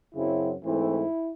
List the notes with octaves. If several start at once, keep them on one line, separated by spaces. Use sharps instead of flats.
F#2 C#3 F#3 C4 E4
G#2 E3 A3 C4 E4